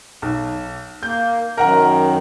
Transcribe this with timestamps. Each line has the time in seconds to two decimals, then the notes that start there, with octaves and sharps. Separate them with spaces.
0.22 B1
1.03 A#3 G6
1.57 F#2 D#3 A#4 F#5 A#5